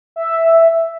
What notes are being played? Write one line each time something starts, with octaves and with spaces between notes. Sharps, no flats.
E5